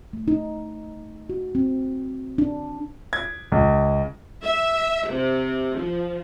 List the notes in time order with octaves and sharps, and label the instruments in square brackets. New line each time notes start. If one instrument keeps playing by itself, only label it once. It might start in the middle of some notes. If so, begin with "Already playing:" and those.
[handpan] A3
D#4
F#4
C4
D4
[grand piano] G#6
C#2
[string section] E5
C3
F3